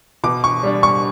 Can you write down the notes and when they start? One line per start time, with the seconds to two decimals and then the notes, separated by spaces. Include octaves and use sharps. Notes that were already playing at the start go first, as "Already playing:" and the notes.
0.24 B2 D6
0.44 C#6
0.63 G3 D4
0.83 C#6